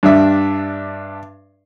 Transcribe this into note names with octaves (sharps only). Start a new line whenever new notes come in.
G2 D4 E5